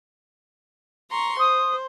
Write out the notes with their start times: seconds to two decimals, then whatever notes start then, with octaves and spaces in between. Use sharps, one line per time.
1.10 A#5 C6 C#6
1.39 C5 D#6